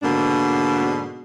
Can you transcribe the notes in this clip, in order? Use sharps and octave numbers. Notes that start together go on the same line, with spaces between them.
G#2 B2 D3 A#3 D4